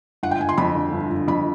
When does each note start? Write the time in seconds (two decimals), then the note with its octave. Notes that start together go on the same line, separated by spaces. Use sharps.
0.23 G1 F#5
0.31 G5
0.40 G1 G#5
0.49 C6
0.58 F2 B5
0.75 D3
0.93 G1
1.11 G1
1.28 F2 B5